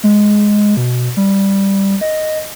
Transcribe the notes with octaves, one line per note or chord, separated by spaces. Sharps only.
G#3
B2
G3
D#5